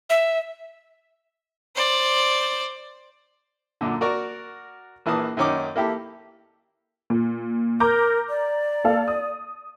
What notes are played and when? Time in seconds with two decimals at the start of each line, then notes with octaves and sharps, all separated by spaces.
0.10 E5
1.75 C5 D5
3.81 F#2 A#2 D3
4.01 F#4 A#4 D5 C#6
5.06 A#1 E3 A#3 A5 D#6
5.37 F#2 D#3 C#4 D#4 D6
5.76 A#3 E4 G4 A4
7.10 A#2
7.80 A#4 A#5 D6 G6
8.29 D5
8.84 A#3 A4 F5
9.08 D#6